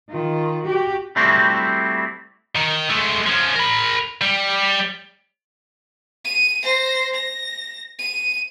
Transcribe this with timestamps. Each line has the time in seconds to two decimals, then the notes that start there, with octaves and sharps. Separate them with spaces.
0.10 D#3 F4
0.64 F#4 G4
1.16 G3 A3 C4 E4 F#4 G4
2.56 D#3
2.90 G#3 A3
3.27 F3 C#4
3.55 A#4 B5
4.22 G3
6.25 D#7
6.63 C5 A#6
7.14 A#6
7.99 D#7